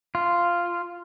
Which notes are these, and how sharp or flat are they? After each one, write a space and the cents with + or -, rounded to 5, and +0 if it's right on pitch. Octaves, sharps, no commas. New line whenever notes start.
F4 -5